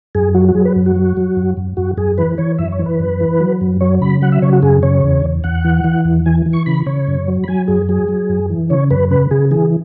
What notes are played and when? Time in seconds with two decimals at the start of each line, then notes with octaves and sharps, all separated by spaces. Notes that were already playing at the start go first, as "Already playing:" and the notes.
0.15 F#2 G#4
0.35 F#3 F#4
0.48 F#4
0.55 F#3 G#4
0.65 B4
0.76 F#2
0.86 F#4
0.96 F#3
1.17 F#3
1.37 F#2
1.57 F#2
1.77 F#2 F#4
1.97 F#2 G#4
2.18 E3 B4
2.38 E3 C#5
2.58 F#2 E5
2.72 C#5
2.79 E3
2.86 B4
3.00 F#2
3.20 E3
3.40 F#3
3.61 F#2
3.81 F#3 C#5
4.01 C#3 B5
4.22 F#3 F#5
4.32 E5
4.42 C#3 C#5
4.53 F#4
4.62 F#2 G#4
4.83 C#3 C#5
5.03 E2
5.24 E2
5.44 E2 F#5
5.64 E3
5.84 E3
6.05 E2
6.26 E3 G#5
6.46 E3
6.53 C#6
6.66 C#3 B5
6.86 C#3 C#5
7.08 F#2
7.28 F#3
7.44 B5
7.48 F#3 G#5
7.68 F#2 G#4
7.89 F#3 G#4
8.09 F#3
8.29 F#2
8.50 E3
8.70 C#3 C#5
8.90 F#2 B4
9.11 C#3 B4
9.31 C#3 G#4
9.51 E3 G#4